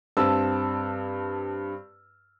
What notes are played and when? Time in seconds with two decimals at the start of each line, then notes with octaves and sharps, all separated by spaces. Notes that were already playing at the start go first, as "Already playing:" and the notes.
0.17 G2 C4 A5 E6